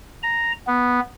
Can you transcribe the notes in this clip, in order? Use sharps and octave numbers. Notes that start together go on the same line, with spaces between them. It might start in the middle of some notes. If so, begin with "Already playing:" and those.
A#5
B3